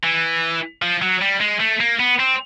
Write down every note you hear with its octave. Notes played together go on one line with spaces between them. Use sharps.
E3
F3
F#3
G3
G#3
A3
A#3
B3
C4